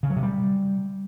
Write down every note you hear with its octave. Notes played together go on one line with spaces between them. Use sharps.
C#3
F#3
C3
G3